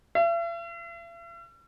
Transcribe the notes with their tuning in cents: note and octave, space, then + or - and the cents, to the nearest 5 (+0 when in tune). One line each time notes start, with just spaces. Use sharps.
E5 +45